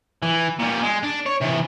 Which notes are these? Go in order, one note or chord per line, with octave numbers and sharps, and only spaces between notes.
E3
A#2 G3
G#3
D4
C#5
C3 E3